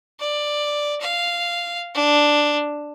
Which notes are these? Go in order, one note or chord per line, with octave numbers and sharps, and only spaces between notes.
D5
F5
D4